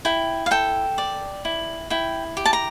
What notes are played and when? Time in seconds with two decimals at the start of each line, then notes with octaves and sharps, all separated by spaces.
0.05 E4 G5
0.46 F5
0.51 A4 G5
0.98 D5
1.45 E4
1.90 E4 G5
2.37 G4
2.45 A5
2.53 A#5